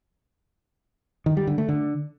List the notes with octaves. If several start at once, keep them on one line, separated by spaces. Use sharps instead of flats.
D#3
G3
D3
A3
D3